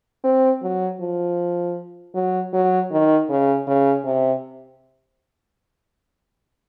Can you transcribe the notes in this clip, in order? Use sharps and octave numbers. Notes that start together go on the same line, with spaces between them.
C4
F#3
F3
F#3
F#3
D#3
C#3
C#3
C3